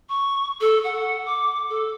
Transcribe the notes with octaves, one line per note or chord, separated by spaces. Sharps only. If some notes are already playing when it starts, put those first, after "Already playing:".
C#6
A4
F#5
D6
A4